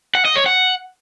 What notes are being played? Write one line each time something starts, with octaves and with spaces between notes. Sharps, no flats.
F#5
D#5
C#5
F#5